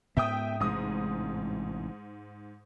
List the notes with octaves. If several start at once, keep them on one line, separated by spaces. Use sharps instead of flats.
G#2 B3 E5 G5 D#6
A1 G#2 C3 G#3 D#6